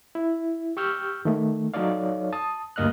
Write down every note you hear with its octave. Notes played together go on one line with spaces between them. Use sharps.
E4
G4 C#6 E6 F6 G6
D#3 A3
F#3 D#4 A4 C#5 D5 F5
A5 D#6
D2 G2 A#3 D#5 F6 F#6